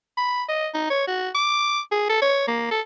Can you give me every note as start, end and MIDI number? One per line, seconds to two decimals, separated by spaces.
0.17 0.43 83
0.49 0.68 75
0.74 0.85 63
0.90 1.06 73
1.07 1.29 66
1.35 1.80 86
1.92 2.05 68
2.09 2.21 69
2.22 2.44 73
2.47 2.68 58
2.71 2.80 69